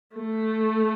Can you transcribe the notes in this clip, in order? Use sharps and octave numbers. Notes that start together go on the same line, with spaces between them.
A3